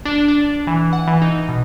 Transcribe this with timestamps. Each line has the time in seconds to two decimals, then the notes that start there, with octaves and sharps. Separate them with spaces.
0.05 D4
0.28 D4
0.67 E3
0.93 F#5
1.07 E3
1.22 D#4
1.49 B2